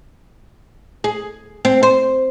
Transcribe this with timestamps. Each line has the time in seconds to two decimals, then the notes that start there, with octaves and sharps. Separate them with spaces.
1.04 G#4
1.65 C4
1.83 C5